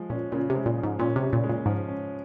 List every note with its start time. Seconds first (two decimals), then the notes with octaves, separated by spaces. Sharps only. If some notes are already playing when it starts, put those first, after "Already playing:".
Already playing: F3 G#3
0.10 A#2 C#4
0.32 A#2 C#3
0.50 C3
0.55 G#3
0.66 A#2
0.77 F3
0.83 G#2
0.99 A#2 C#4
1.16 C3
1.22 C#3
1.33 A#2
1.44 G#3
1.49 A#2
1.66 G#2 F3
1.88 C#4